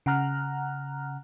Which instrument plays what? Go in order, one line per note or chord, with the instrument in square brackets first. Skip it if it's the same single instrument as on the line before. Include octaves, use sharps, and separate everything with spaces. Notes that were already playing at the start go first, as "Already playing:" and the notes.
[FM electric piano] C#3 F#5 A#5 F6 F#6